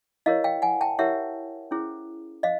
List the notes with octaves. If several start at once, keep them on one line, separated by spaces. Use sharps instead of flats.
E4 G4 A#4 C#5 D#5 F5
F5 G5
F#5 G#5
G5 A5
E4 G4 A#4 C#5 E5 F#5
C#4 E4 G#4 C5
C5 D#5 F5